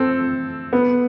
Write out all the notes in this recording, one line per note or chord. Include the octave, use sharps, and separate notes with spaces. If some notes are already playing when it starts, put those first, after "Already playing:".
Already playing: C4 A4
B3